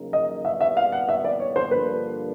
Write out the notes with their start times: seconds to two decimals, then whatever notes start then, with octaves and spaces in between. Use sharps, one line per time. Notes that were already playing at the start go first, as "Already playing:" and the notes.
Already playing: E2 C#3 F#3 A#3 D#4
0.13 D#5
0.45 C2 A#2 G3 B3 E5
0.61 E5
0.77 F5
0.92 F#5
1.09 E5
1.24 D5
1.40 C#5
1.56 C5
1.71 G2 D3 F3 A#3 D4 B4